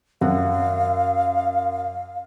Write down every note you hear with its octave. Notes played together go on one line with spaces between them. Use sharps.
F#2 F5 F#5